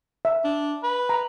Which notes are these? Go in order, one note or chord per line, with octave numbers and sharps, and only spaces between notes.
E5
D4
B4
A#5